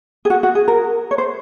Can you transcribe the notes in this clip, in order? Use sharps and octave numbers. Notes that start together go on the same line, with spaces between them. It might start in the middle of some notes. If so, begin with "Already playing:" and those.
G#4
F#4
F#4
G#4
A#4
C#5
C5